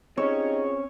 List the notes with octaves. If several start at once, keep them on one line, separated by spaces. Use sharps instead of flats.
C4 C#4 D#4 F4 G4 G#4 C#5